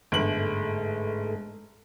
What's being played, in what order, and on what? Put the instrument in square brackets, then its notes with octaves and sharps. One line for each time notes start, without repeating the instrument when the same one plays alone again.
[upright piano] G1 F#7 [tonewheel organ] G#2 G#3 A3